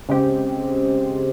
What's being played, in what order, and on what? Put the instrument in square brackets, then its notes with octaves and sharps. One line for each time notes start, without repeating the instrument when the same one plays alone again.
[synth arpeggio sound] C#3 G#3 C4 G4